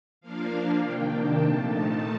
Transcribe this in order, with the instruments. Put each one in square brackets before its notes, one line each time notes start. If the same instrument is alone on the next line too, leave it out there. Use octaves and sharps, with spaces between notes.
[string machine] F3 A#3 D4 F5
C3 D#3 A#3 D4 G5
A5
A#2 F3 A3 D#4